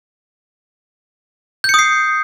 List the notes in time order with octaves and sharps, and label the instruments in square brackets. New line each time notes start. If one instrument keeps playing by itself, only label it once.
[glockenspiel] G6
C#7
D#6
C7